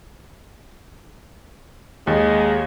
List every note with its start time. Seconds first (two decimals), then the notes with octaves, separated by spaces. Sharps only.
2.07 D#2 G#3 D#5